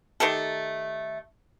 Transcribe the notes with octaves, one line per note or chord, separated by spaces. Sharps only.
D#3 A3 G4 A4